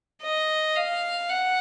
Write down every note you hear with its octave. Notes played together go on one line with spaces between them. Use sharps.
D#5
F5
F#5